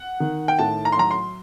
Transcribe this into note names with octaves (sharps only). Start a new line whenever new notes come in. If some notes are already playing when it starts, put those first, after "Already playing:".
Already playing: F#5
D#3
G5
A2 A5
A#5
C6
F#3 A#5
C6